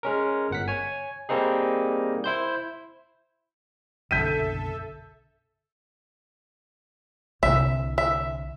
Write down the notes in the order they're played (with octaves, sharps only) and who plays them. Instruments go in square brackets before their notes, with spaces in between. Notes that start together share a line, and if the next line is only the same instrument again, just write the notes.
[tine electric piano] G#3 C#4 A#4
G1 F#5 B6
C#5 G#5
G3 A#3 C4 D#4 G#4
E4 C5 G6
[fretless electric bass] F#1 B1 D3 [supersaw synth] A4 E5 [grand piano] G6 B6 D#7
[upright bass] C2 D3 [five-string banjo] E5
[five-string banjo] E5